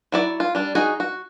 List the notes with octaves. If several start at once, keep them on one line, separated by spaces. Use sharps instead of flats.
F#3 E4 D5
F4
G3 D4
D#4 F#4 G#4
F#4